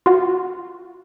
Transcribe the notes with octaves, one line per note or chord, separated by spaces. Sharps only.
F4 F#4